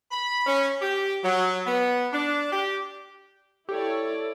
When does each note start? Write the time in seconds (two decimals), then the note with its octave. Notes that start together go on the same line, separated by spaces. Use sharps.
0.12 B5
0.47 C#4
0.81 G4
1.24 F#3
1.67 B3
2.13 D4
2.52 G4
3.69 E4 G4 A4 C#5 D5